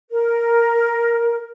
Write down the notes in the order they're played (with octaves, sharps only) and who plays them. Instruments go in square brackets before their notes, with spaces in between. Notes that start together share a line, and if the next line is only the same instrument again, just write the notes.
[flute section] A#4